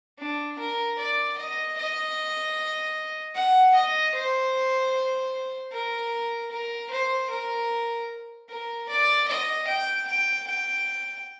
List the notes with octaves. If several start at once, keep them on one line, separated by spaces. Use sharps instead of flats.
D4
A#4
D5
D#5
D#5
F#5
D#5
C5
A#4
A#4
C5
A#4
A#4
D5
D#5
G5
G5
G5